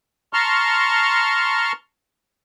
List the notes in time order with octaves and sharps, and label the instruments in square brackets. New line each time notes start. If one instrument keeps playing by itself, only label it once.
[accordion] A5 A#5 C6 C#6 F6